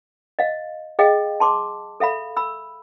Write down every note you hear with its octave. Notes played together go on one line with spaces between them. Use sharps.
D#5 F5
G#4 D#5 F5 G5
A5 C6 D6
A4 E5 F5 B5
B5 E6